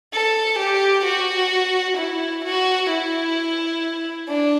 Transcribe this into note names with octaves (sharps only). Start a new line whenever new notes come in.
A4
G4
F#4
E4
F#4
E4
D4